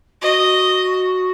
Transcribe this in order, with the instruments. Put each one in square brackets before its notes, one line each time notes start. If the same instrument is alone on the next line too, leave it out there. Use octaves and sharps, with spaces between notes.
[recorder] F#4 [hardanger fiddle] D#5